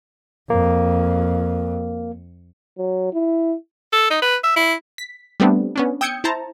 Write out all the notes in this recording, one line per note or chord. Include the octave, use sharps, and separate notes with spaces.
F2 A#3
F#3
E4
A4
D#4
B4
E5
E4
B6
G3 A3 B3 C4 D4
B3 C#4 D4
G5 D#6 E6 G6 G#6 C#7
E4 C5 A5 A#5